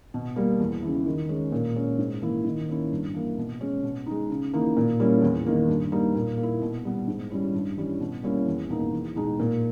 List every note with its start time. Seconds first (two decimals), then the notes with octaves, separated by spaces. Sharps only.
0.14 B2
0.36 G3 A#3
0.60 E2
0.83 C#3 E3
1.06 D#3
1.29 G#3 C#4
1.52 A#2
1.75 G#3 C#4
1.98 G#2
2.22 E3 A#3 E4
2.44 D#3
2.68 A#3 C#4 E4
2.92 G2
3.14 E3 A#3
3.38 B2
3.61 G#3 C#4
3.83 B2
4.07 G#3 D#4
4.30 C#3
4.53 E3 A#3 D#4
4.77 A#2
4.99 G3 A#3 C#4 E4
5.22 E2
5.46 D#3 A#3
5.69 G2
5.92 G3 A#3 D#4
6.15 A#2
6.38 A#3
6.43 E4
6.62 B2
6.85 G3 B3
7.07 G#2
7.30 G3 C#4 E4
7.54 G2
7.77 E3 G3 C#4 E4
8.00 B2
8.23 G3 A#3 C#4 E4
8.47 E2
8.70 B2 A#3 D#4
8.93 E2
9.16 B2 G#3 D#4
9.40 A#2